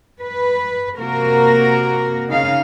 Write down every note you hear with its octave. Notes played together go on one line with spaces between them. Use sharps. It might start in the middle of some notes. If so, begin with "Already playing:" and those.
B4
C3 A#3 F#4 A#4
C#3 D#4 F5